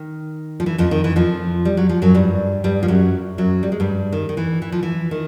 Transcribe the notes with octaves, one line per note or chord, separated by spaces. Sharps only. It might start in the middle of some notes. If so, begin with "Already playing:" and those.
Already playing: D#3
F3
E3
F2 F3
D#3
E3
F2 F3
G3
F#3
F3
F#2 F#3
G2 G3
G2 G3
F3
F#2 F#3
F#2 F#3
G3
G#3
G2 G3
D#3
D#3
E3
E3
F3
E3
D#3